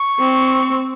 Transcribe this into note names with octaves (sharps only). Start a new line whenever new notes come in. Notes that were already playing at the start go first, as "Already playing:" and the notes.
Already playing: C#6
C4